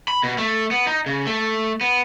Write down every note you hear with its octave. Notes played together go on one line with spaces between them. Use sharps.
B5
B2
A3
B3
D#4
C#3
A3
B3